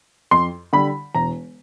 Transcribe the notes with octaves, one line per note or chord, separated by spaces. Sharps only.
F2 C6
D3 G3 B5
E1 A#5